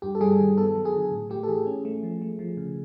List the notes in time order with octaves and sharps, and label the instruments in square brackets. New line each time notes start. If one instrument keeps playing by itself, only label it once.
[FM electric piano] G2 G4
A4
G3 G#4
D#3
B3 A4
F#3
G#4
D3
A2
A3 G4
A4
E3 G#4
C#4
A3
F3
A3
F3
C#3